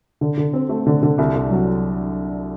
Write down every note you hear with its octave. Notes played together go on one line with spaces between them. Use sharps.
D3
D3
C4
A3
D3
D3
C2
C2
F#3